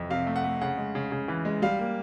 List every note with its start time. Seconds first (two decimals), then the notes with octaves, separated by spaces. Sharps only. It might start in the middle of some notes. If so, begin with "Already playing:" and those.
Already playing: F2 C3 E3
0.10 C3 F5
0.27 A3
0.36 F#5
0.44 A3
0.61 C#3 F#5
0.77 G#3
0.95 C#3
1.12 C#3
1.28 E3
1.45 G#3
1.62 G3 F5
1.79 A#3